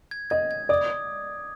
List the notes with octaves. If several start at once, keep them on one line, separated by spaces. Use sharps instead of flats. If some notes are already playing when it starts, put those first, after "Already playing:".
G#6
D#5 G#6
G#6
D5 D#6